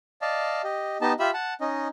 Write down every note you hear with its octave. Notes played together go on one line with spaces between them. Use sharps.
D5 D#5 F5 A5
G4 D#5
B3 D#4 G4 D#5 A5
F4 G4 E5 B5 E6
F#5 A5
C#4 D#4 D#5